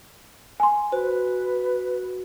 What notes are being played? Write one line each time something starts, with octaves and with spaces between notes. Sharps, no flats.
G#5 C6
F#4 B4 C5